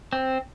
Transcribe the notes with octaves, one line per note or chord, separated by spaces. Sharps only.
C4